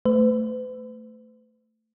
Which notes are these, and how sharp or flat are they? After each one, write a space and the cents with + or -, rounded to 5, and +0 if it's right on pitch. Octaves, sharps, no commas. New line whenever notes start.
A3 +15 B4 +45